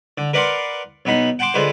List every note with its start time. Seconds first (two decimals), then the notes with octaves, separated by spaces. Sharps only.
0.18 D3
0.34 A#4 B4 D5 F5 F#5 C6
1.05 B1 B3 D#4 B5
1.39 F#5 G5 A5 C6 D6
1.54 D3 G#3 F4 B4 C5